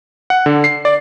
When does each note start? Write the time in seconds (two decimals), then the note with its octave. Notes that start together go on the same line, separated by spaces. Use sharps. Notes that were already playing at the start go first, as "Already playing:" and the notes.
0.30 F#5
0.46 D3
0.64 C7
0.85 D5